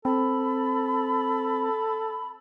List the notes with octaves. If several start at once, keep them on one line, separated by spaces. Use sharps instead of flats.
C4 A4 B5